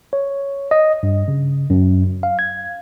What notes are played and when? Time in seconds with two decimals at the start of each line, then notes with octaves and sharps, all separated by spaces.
0.13 C#5
0.71 D#5
1.03 G2
1.28 C#3
1.70 F#2
2.23 F5
2.39 G#6